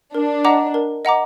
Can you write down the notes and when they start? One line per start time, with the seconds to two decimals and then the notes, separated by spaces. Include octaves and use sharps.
0.15 D4 A#4
0.45 D#5 F#5 A#5 D6
0.74 A#4
1.05 D#5 F#5 A#5 D6